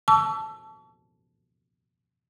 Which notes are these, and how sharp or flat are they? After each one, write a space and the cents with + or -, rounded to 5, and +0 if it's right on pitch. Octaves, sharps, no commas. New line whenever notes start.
A5 -10 C#6 +40 E6 +25